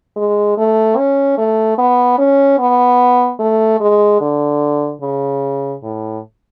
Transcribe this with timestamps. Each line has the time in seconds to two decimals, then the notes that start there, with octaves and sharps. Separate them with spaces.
0.16 G#3
0.57 A3
0.97 C#4
1.38 A3
1.78 B3
2.18 C#4
2.59 B3
3.39 A3
3.80 G#3
4.21 D3
5.02 C#3
5.83 A2